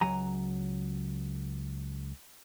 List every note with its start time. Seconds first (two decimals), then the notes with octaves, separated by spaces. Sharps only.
0.01 C#2 F#3 G#5 A#5